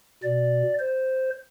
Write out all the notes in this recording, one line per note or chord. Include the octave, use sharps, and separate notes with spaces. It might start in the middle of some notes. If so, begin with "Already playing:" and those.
B2 D5
C5